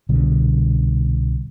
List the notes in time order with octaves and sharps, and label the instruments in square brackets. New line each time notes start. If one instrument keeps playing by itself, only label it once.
[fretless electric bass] C2 B2 D3 G3